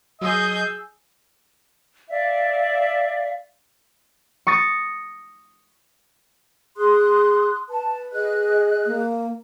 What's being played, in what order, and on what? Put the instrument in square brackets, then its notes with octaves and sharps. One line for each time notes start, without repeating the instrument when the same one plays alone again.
[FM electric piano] F#3 [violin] G#4 G6 [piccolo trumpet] D#5 [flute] E6
[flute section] D5 E5 F5
[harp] C#6 D#6 A6 A#6
[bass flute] G#4 [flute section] C6 D#6 F#6
[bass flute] B4 [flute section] A5
[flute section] G#4 D#5 F#6
[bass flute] A#3